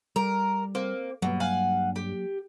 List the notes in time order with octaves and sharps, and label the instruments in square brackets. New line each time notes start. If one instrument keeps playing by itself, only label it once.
[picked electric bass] G3 [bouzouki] A#4
[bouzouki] A#3 [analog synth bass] C4
[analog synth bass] G2 [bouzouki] B2 [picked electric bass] F#3 A#3
[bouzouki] F5 F#5 G#5
G4